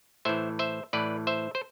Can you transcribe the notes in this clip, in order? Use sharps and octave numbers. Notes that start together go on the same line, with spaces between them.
A2 E3 C5 E5
C5 E5
A2 E3 B4 D5
C5 E5
C5